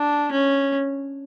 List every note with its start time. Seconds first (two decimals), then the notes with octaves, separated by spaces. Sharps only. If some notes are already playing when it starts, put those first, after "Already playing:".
Already playing: D4
0.32 C#4